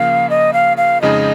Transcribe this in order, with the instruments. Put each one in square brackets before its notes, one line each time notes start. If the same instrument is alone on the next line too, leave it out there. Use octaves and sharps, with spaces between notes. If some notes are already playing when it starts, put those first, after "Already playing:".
Already playing: [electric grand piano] C#3 F3 A#3 [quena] F5
[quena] D#5
F5
F5
[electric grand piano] F2 C#3 G#3 D#4 G#4 [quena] D#5